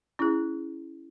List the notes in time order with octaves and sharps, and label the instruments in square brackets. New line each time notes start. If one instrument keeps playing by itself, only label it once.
[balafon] C#4 E4 G#4